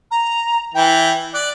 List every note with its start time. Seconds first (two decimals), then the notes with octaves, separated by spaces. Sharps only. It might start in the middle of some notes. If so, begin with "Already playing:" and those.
0.11 A#5
0.74 E3 G5
1.34 D5 F#6